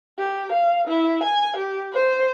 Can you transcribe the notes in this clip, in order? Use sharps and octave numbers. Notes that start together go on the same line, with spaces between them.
G4
F5
E4
G#5
G4
C5